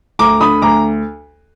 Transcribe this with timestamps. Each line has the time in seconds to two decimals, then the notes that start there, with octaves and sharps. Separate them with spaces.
0.19 D2 A#5 D6
0.40 D3 B5 D#6
0.62 D2 A#5 D6